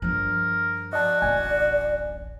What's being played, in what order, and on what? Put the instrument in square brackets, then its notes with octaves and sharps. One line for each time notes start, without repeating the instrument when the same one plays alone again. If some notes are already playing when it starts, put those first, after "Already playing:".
[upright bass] G2 F3 [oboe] A#4
[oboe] F#4 [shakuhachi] D5 [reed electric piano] D#5 A5
[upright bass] D1 A1 [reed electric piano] G#5